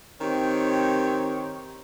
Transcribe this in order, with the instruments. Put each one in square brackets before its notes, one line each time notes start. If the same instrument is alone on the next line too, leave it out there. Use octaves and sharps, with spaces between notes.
[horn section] D#3 C4 G4 C#5